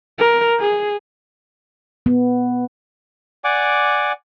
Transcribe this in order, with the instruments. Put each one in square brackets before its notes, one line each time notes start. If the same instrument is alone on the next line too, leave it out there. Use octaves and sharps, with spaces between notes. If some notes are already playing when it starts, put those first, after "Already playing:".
[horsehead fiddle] A#4
G#4
[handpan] B3
[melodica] D5 F#5 G#5 D6